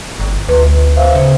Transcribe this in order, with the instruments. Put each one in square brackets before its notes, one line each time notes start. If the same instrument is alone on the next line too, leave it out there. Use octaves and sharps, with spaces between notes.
[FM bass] G1
[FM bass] D2 [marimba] B4
[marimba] C5 E5 F5
[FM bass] C#3